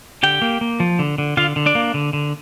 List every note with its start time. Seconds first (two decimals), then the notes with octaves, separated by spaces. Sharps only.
0.23 D3 G4 G5
0.42 A#3
0.61 A#3
0.80 F3
0.99 D3
1.18 D3
1.37 D3 F4 F5
1.56 D3
1.66 D4 D5
1.75 A#3
1.94 D3
2.13 D3